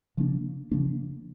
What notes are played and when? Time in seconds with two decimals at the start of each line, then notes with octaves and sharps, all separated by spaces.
0.17 C#3 F3 A#3 D4
0.71 C#3 F3 A#3 D4